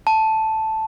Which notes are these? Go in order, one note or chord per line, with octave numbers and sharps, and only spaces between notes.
A5